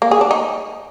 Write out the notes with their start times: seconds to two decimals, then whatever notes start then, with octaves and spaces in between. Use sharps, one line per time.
0.02 A#3
0.11 G#4
0.21 D4
0.31 D#4